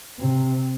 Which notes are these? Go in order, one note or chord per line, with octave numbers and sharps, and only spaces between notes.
C3